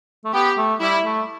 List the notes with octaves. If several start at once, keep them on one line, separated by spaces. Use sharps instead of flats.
A3
B3 G4
A3
G3 E4
A3